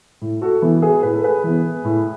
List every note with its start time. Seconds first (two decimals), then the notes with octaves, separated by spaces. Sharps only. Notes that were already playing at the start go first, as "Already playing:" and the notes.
0.22 A2
0.42 F#4 A4
0.62 E3 B3
0.82 G#4 B4
1.03 A2 B4
1.14 A4
1.24 G#4 B4
1.44 E3 B3
1.84 A2